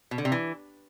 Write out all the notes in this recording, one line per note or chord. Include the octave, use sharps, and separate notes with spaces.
B2
D3
C3
E3